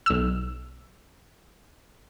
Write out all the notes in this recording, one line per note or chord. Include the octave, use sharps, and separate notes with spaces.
B1 E6